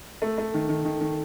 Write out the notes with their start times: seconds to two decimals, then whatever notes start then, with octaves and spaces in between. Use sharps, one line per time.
0.22 A3
0.38 A3
0.54 D#3
0.69 D#3
0.85 D#3
1.01 D#3